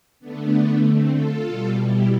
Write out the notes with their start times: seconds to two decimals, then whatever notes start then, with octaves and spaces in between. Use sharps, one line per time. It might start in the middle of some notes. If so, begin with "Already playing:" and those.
0.20 D3 A3 B3 D4
0.83 C4
1.14 F4 A4
1.46 B2 G3
1.77 E4 G4